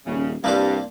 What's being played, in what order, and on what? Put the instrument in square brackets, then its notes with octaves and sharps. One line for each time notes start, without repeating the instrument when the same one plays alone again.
[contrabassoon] D#1 [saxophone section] C#3
[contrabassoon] C2 [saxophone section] G2 [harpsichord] A#3 D4 C5